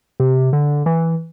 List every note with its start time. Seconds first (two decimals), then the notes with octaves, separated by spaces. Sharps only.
0.20 C3
0.53 D3
0.86 E3